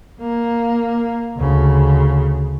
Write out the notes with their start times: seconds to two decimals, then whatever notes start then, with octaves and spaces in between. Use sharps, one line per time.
0.20 A#3
1.38 D2 C#3